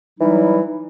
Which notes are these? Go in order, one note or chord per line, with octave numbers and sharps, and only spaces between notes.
E3 F#3 G3 D#4